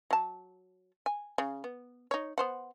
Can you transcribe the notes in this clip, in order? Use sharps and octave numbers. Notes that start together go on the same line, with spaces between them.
F#3 A5
G#5
C#3
B3
D#4 C#5
B3 C5 F#5